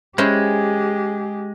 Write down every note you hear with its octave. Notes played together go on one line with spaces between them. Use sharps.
G#3 C#4 E4 G4 G#4 C5